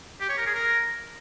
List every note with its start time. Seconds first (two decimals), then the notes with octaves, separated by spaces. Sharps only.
0.20 G4
0.29 C#5
0.37 A#4
0.46 G#4
0.55 A#4